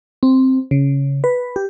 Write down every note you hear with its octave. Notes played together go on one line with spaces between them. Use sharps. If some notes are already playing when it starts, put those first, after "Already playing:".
C4
C#3
B4
G4